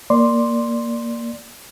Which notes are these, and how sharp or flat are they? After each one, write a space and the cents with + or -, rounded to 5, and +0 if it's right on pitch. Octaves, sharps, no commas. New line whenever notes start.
A#3 +0 D5 +0 C6 +0